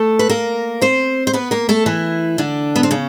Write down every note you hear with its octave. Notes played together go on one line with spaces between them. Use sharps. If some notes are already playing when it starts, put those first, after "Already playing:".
Already playing: A3 A4
B4
A#3 A#4
C4 C5
C5
B3 B4
A#3 A#4
A3 A4
E3 E4
D3 D4
B3
C4
C#3 C#4